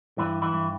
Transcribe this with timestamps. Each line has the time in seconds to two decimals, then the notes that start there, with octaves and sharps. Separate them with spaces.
0.18 G2 E3 E4
0.42 E3 E4
0.53 G2